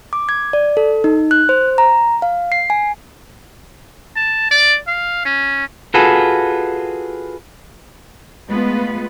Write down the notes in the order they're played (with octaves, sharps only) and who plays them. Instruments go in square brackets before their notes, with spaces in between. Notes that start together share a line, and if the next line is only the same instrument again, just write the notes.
[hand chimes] D6
G#6
D5
A4
D#4
F#6
C5
A#5
F5
C7
G#5
[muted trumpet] A5
D5
F5
C#4
[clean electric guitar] F4 F#4 G#4 A4 B4
[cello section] G#3 A3 B3 F4 B4